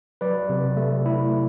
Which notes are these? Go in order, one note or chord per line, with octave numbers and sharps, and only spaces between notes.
F#3 B4 D5
C3
A3
E4